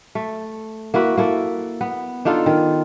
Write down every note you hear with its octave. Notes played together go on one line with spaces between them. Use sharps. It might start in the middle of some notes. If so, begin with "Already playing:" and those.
A3
A#3 E4 F#4 B4
A#3 E4 A4
B3
D4 D#4 F4 A4
D#3